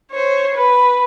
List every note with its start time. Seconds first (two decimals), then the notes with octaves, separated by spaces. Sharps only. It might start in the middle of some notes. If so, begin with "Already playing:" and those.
0.11 C5 C#5
0.54 B4